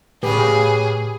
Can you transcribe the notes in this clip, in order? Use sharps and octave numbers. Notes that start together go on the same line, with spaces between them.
A2 C#3 G4 G#4 B4